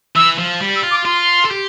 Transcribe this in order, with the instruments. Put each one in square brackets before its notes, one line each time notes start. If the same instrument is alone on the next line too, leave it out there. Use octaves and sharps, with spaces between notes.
[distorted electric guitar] E3 [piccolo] E6
[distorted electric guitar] F3
G3
[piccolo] E6
[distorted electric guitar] F4
[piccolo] D6
[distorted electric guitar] F4 [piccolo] C6
[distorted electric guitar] A4
G4